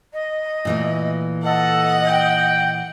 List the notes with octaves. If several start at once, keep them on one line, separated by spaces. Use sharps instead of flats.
D#5
A#2 E3 A3
A4 D#5 F#5
G5